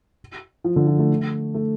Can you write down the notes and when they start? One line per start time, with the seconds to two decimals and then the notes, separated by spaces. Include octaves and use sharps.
0.64 F3
0.76 D3
0.87 F3
0.99 A3
1.54 A3